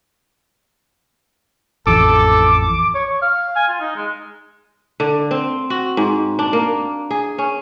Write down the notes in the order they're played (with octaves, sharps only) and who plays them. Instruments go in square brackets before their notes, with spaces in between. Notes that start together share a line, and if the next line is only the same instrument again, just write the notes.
[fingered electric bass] A1 F2 E3 [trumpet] A4 [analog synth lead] D6
[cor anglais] C#5
C#5
F5
G#5
F4
D#4
G#3
[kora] D3
C4
F#4
G#2
D4
A#3
G#4
C#4